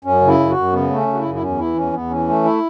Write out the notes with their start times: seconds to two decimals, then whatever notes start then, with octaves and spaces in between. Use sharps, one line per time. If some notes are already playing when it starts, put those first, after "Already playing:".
0.05 F#2 C#4
0.21 C#3
0.27 E4
0.39 F#2
0.50 F#4
0.57 F#2
0.73 C#3 B3
0.90 A3
0.96 C#4
1.07 C#3
1.13 F#4
1.19 E4
1.25 F#2
1.34 E4
1.41 E2 C#4
1.59 E3 E4
1.77 E2 C#4
1.94 E2 B3
2.10 E3 C#4
2.28 A3
2.45 E4